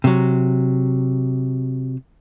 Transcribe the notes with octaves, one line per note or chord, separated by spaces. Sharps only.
C3 F#3